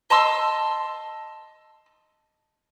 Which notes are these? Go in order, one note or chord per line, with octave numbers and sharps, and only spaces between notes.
D#5 A5 C6 E6